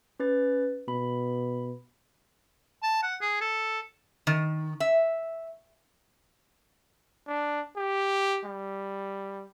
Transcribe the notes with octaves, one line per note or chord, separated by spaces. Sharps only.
C#4 B4 A6
B2 B5
A5
F#5
G#4
A4
D#3
E5
D4
G4
G3